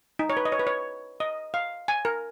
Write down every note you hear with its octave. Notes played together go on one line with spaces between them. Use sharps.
D#4
C#5
B4
D#5
C#5
B4
C#5
D#5
F5
G#5
A#4